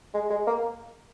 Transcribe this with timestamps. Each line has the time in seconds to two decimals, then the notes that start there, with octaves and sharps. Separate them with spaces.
0.14 G#3
0.30 G#3
0.47 A#3